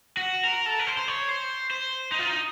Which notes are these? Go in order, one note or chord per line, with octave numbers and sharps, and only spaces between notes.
F#4
A#4
A4
A#4
C5
C5
C#5
C5
C5
D#4
F4
D#4